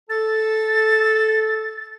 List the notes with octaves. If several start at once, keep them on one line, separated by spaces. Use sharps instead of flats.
A4 A6